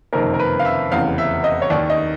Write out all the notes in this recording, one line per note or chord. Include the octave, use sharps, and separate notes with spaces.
F#1 F2 C3 D#3 A#4
A#4
B4
F5
E5
F1 E2 C#3 F5
E5
D#5
C#5
D#2 D#3 D5
D#5